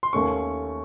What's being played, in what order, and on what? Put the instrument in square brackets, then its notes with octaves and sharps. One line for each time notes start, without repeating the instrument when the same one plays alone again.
[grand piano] C6
[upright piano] D#2 D#3 A3 C#4 [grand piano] C#6